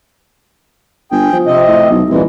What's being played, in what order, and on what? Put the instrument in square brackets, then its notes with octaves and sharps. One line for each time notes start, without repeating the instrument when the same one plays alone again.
[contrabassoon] G1 [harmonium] G#4 G5
[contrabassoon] F3
[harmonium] C3 C4 D#5
[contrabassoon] A2
B1
[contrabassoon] C2 [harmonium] A#2 E3 G#3